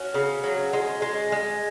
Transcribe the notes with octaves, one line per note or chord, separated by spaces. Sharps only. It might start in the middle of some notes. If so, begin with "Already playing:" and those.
Already playing: C#4 F#4
C#3
F#3
G#3
G#3
G#3